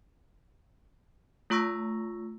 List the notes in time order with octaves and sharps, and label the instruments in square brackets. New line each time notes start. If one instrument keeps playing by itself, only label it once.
[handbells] A3 F4 A#5 C#6 E6 A#6